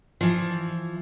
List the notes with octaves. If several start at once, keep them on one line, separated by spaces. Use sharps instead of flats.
E3 F3